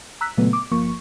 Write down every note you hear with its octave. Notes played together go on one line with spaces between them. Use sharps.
A#5 E6 F#6 B6
A#2 C#3 F#3 A3 B3
D6
G1 F3 A#3 C#6